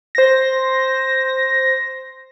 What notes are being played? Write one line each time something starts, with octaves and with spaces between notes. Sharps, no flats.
C5 A#6